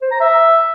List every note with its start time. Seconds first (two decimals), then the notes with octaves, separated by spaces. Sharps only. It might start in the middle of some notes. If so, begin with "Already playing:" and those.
0.02 C5
0.11 A#5
0.21 E5